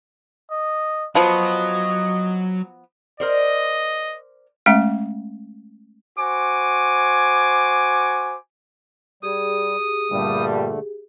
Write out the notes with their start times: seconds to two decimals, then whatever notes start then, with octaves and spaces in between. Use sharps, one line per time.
0.51 D#5
1.15 F3 F#3 B3 D#5
3.20 A#4 C5 D5 D#5
4.66 G#3 A3 C#4 E5
6.19 F#4 C5 G#5 D6
9.23 G3 G4 G#4 D#6
10.12 G2 A#2 D3 G3 A3